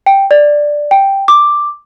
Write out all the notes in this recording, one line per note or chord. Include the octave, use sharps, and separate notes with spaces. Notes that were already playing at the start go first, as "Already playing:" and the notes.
G5
D5
G5
D6